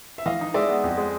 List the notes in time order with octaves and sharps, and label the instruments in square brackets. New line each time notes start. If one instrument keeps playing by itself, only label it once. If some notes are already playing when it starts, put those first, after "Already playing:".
[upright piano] E5
[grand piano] E3 [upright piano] D#5 F5
[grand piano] D#4
[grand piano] G#3 [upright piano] D5 E5
[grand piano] B3
F2
G#3